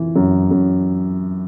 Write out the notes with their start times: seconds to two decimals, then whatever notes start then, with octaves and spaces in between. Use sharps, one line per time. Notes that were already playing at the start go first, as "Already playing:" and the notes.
Already playing: E3
0.16 F#2
0.51 F#2